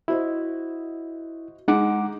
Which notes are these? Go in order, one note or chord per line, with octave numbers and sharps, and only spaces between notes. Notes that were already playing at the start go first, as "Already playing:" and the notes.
E4 F#4 C5 D#5
G#3 D#4 F#5 D6